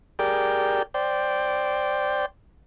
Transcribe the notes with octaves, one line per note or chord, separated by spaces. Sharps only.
G4 G#4 A#4 D5 G5
C5 D5 G5